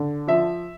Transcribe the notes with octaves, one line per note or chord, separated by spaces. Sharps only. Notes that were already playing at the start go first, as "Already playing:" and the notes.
Already playing: D3
F3 E5